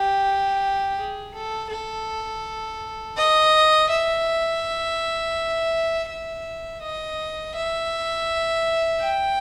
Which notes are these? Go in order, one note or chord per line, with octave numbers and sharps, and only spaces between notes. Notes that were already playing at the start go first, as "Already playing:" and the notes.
Already playing: G4
G#4
A4
A4
D#5
E5
E5
D#5
E5
G5